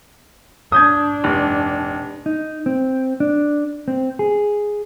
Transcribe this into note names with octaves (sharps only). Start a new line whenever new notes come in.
D4 D#6 G6 G#6
F1
D#4
C4
D4
C4
G#4